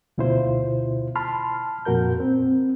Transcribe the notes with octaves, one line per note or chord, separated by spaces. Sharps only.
D2 B2 E4 F4 C5
A5 B5 C6 F6
F2 A#2 F#4 A#4 G6
C4